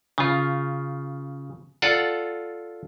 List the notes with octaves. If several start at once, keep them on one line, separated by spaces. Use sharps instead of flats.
C#3 F4
F4 A4 D5 F#5